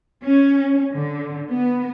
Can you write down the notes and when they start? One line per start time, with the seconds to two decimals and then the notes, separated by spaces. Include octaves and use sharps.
0.23 C#4
0.93 D3
1.50 B3